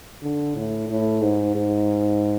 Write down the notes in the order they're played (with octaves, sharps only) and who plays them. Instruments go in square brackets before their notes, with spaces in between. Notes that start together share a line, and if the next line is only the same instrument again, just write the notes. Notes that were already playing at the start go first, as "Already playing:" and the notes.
[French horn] D3
A2
A2
G#2
G#2